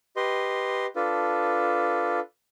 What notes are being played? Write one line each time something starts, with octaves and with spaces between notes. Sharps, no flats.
G4 B4 D#5 C6
D4 F4 A4 B4